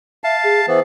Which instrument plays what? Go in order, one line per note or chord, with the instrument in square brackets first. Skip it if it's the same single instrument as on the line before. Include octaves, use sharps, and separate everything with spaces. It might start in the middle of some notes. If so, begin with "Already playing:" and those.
[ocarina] E5 [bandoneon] F5 A5
[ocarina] G#4
[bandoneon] E3 B3 [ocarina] C5